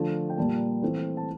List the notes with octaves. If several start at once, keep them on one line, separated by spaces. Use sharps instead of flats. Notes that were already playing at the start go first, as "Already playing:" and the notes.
Already playing: D3 F3 A3 A5
G5
A#2 G3 A#3 A5
E3 A3 C4
A5